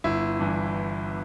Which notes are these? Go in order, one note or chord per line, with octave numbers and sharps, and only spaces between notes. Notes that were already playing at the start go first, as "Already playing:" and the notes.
G1 E4
G2 E3